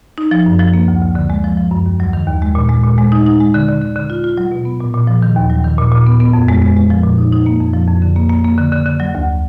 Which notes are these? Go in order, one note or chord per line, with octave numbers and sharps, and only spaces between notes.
D#4
F3
F#2
F3
A#3
D2
D2
D3
G#3
F3
F3
F#2
D#2
F#3
D#3
D#2
G#3
A#2
G#3
A#2
G#3
D#4
D#4
G#3
D3
D3
D3
D3
F4
F4
F#3
B2
B3
A#2
A#2
F3
D#3
D#2
F#3
D#3
A#2
A#2
B3
B3
F2
G#3
G#3
G#3
F3
A#2
D#4
D#4
A#3
F2
F3
F2
D3
A#3
A#3
A#3
D3
D3
D3
F#3
D2